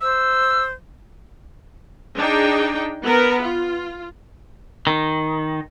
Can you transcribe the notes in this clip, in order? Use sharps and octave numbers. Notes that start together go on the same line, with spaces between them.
C5 E6
D4 D#4 G#4 G5
B3 A#4 B4
F4
D#3